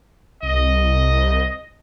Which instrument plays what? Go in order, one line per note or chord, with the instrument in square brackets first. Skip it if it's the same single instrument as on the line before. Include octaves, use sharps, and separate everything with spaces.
[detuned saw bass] C2 [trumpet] D#5